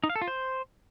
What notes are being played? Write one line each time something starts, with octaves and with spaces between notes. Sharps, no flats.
D#4
F5
A4
F4
C5